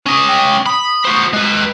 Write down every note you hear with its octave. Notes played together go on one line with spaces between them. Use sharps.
C#4 D#5
G5
B5 D#6
F#4 C5
G#3 B4